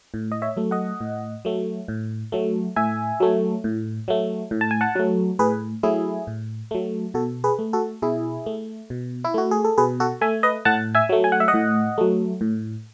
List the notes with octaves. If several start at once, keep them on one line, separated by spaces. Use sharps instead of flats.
A2
D#5
C#5 E5
F#3 A3
D#5 F#5
A2
F#3 A3
A2
F#3 A3
A2 E5 G#5
F#3 A3
A2
F#3 A3
A2
A5
G#5
F#5 A5
F#3 A3
A2 G#4 B4
F#3 A3 E4 G#4
A2
F#3 A3
B2 F#4 A4
G#4 B4
A3
F#4 A4
B2 E4 G#4
A3
B2
E4
A3 F#4
G#4
A4
B2 G#4 B4
F#4 A4
A3 E5 G#5
B4 D#5
A2 F#5 A5
E5 G#5
F#3 A3
G#5
F#5
E5
D#5 F#5
A2
F#3 A3
A2